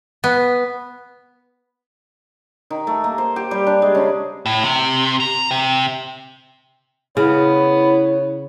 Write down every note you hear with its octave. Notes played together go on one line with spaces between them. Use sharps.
B3
D#3
A3
A#3
C5
G4
G3
D4
G#3
C#3
A2
C3
A#5
C3
C#3 B3 E4 C#5